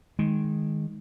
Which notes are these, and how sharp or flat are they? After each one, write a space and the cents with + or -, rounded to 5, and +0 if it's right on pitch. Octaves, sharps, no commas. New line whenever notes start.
D#3 +0 G#3 +0